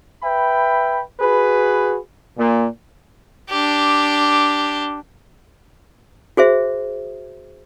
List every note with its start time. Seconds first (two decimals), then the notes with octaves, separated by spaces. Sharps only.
0.23 B4 E5 G5 B5
1.20 F#4 G#4 B4
2.38 A#2
3.49 D4 G4
6.37 F#4 G#4 C5 E5